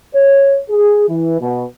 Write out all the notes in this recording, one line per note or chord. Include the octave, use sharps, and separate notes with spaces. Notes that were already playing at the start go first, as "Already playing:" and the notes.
C#5
G#4
E3
B2